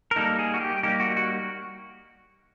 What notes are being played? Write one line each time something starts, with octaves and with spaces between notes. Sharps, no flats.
A#4
G3 A#3 D#4 A4
G#4
F#4
G4
G3 A#3 D#4 G4
F#4
F#4